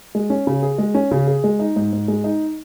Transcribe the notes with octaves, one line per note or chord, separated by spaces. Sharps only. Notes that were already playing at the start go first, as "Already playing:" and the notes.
G#3
C#4
C#3
G#4
G#3
C#4
C#3
G#4
G#3
D#4
G#2
G#2
G#3
D#4